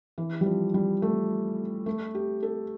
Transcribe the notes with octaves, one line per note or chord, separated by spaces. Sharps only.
E3
G3
F3
G3
A3
A3
G4
A4